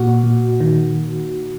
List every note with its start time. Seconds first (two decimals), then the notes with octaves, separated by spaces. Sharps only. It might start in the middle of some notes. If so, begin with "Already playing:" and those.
Already playing: A#2 F#4
0.24 A#2
0.60 D#3